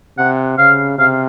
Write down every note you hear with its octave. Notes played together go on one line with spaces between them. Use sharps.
C3 F#5
C#3 F5
C3 F5